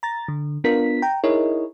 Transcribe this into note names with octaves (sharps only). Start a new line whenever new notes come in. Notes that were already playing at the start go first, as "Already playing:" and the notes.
A#5 A6
D3
B3 D4 F4 A#4 B6
G5 A#5
D#4 E4 G#4 A#4 C#5 D#5